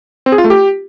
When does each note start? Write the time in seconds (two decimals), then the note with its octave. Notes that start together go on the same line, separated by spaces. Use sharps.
0.26 C4
0.32 G#4
0.38 F4
0.44 A3
0.50 G4